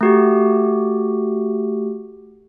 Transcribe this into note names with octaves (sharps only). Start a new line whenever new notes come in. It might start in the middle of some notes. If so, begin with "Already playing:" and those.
A3 F#4 G4